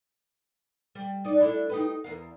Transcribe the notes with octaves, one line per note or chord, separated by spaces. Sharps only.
G3
D#4 D5
D4 E4 A4
D#4 G4 B4
E2 A#4 F5